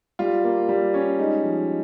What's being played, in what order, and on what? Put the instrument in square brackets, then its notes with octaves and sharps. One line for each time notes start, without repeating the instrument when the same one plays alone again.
[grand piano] G3 F4
A#3
G3
C#4
G#3 D#4
F3